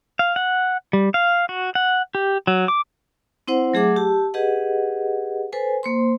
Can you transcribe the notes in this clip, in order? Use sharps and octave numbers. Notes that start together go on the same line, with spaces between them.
F5
F#5
G3
F5
F#4
F#5
G4
F#3
D6
C4 E4 C5 F#5
F#3 A3 G#4 E5 F#5 D6
G4 A5 E6
G4 G#4 B4 D#5 F#5
A4 B4 C5 G#5
A#3 C5 C6